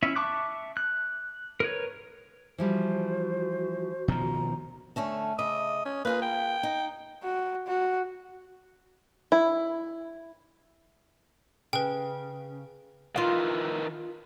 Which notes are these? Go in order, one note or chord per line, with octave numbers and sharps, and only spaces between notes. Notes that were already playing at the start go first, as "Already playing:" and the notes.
C#4 E4 E5
E5 A5 C#6 D6 F#6
F#6
A#4 B4 C#5
E3 F3 G3 F#4 C5
B2 D#3 F3 A#5
D3 A3 C#4
C#3 D#5 E5
C#4
A#3 F4 G#4 B4
G5
D#4
F#4
F#4
E4
C#3 B4 G5
D#3 E3 F4 F5